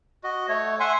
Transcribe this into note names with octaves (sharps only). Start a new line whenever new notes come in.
F#4 D#5
A3 C#5
E5 F#5 G#5 C6